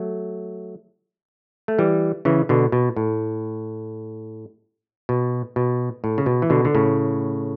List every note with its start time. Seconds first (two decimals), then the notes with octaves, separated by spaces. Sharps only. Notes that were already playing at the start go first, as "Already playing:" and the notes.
Already playing: F#3 A3
1.68 A3
1.78 E3 G3
2.25 C#3 E3
2.49 B2 D3
2.72 B2
2.96 A2
5.09 B2
5.56 B2
6.04 A2
6.18 C#3
6.26 B2
6.42 E3
6.50 B2 D3
6.65 D3
6.75 A2 C#3